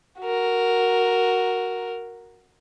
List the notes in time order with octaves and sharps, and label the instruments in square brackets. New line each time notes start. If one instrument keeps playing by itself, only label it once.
[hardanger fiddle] F#4 A#4